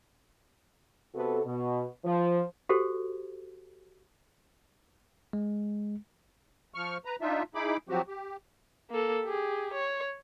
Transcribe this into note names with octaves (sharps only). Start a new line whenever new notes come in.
C3 B3 F#4 A4
B2
F3
F#4 G4 A4 C5
G#3
F3 C#6 F6
B4 A#5
D4 D#4 F4 E5
D#4 E4 G#4 B5 D6
F3 F#3 C4 F#4 G4
G4
A#3 A4
G4 G#4
C#5